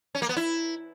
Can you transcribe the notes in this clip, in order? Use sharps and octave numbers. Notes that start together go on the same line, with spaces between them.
C#4
A#3
B3
E4